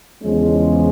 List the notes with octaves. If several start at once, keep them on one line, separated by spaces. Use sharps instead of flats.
E2 C#3 F3 G#3 C#4